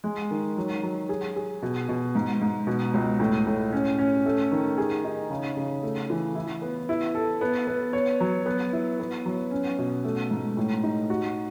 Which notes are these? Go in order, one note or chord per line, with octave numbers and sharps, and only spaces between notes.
G#3
D#3
F#3
F#3
G#4
G#4
B2
B2
G#2
G#2
B2
C#2
A2
A2
C#4
C#4
A3
D#3
G#4
D#4
C#3
C#3
A3
E3
E4
B3
E4
A4
B3
B3
C#5
F#3
B3
E4
B3
F#3
C#4
B2
A3
G#2
A2
D#4
F#4